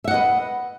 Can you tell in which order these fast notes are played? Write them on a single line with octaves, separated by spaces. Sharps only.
E5 F#5 D#5 B4